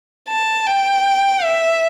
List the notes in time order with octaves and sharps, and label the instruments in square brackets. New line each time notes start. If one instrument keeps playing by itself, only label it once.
[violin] A5
G5
E5